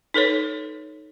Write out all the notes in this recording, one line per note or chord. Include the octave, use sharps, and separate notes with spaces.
D#4 A4 B4 C#5